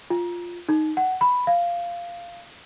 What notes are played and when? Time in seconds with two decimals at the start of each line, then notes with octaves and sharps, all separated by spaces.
0.10 F4
0.69 D#4
0.97 F#5
1.21 B5
1.47 F5